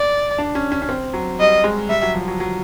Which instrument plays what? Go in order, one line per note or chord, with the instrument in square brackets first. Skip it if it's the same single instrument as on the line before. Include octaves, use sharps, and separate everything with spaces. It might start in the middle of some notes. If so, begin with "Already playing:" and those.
Already playing: [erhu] D5
[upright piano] D4
C#4
C#4
C#4
C4
F#3
[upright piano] G3 [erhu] D#5
[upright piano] G#3
[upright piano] G3 [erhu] E5
[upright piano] F#3
F3
F#3
F#3